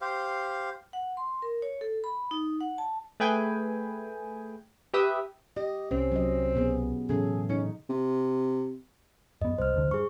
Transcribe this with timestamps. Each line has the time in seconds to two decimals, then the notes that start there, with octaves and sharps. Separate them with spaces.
0.01 G4 C5 F5
0.93 F#5
1.17 C6
1.42 A#4
1.62 C#5
1.81 A4
2.04 B5
2.31 D#4
2.61 F#5
2.78 A5
3.20 A3 G#4 B4 G5 G#5
4.94 G4 B4 E5 D#6
5.57 G4 D#5
5.91 C2 C4 C#4
6.12 F#3 C#4 D#5
6.55 B2 B3 G#4
7.09 A2 C#3 E3 F#3 C#4 G#4 A4
7.50 C#4 D#4
7.89 C3
9.42 F#2 B3 D#5
9.58 C2 C5 F6
9.74 F1 D2 D3
9.91 G2 G#4 C#6